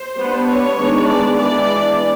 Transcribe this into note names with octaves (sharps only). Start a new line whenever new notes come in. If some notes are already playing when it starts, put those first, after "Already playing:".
Already playing: C5
G3 B3 D4
C#5
D#3 G#3 B3 D4
D5
E3 G#3 B3 D4 D5